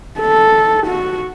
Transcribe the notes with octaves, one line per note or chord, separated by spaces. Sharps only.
A4
F#4